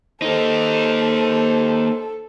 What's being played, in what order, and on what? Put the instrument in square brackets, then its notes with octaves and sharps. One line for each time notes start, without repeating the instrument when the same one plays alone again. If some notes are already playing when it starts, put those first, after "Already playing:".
[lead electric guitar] A#3 D#4 [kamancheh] A4 [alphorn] C5